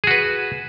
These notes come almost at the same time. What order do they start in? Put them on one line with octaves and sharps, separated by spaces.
G#4 F#4 B4